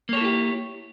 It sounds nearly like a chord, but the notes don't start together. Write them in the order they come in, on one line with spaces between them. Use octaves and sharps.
A#3 C#5 A4 E4 G4